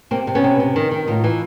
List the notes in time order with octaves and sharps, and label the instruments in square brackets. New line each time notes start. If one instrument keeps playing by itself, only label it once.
[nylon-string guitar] C3 A#3 C4
C3
B3 C#4
C3
C3
D#3
D#3
A2 D#4 F4
E3